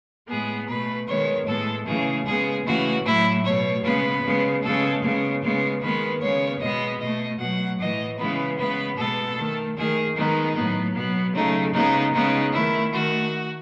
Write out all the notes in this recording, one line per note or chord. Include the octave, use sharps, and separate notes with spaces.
A2 G#3 B3 G#4
B2 A3 B4
D#3 G#3 B3 C#5
A2 G#3 B3 A4
C#3 E3 A3 G#4
C#3 G#3 B3 G#4
C#3 E3 A3 F#4
A2 F#3 A3 E4
B2 A3 C#5
C#3 G#3 B3 B4
C#3 G#3 B3
C#3 G#3 B3 A4
C#3 G#3 B3
C#3 G#3 B3
D#3 G#3 B3 B4
C#3 G#3 B3 C#5
B2 G#3 B3 D#5
B2 A3 D#5
B2 F#3 A3 F#5
A2 E3 A3 D#5
C#3 E3 G#3 B3 B4
C#3 G#3 B3 B4
B2 G#3 B3 A4
D#3 A3
D#3 A3 G#4
D#3 G#3 B3 D#4
A2 F#3 B3
B2 F#3 B3
C#3 F#3 A3 D#4
C#3 G#3 B3 D#4
C#3 G#3 B3 D#4
D#3 A3 E4
D#3 A3 F#4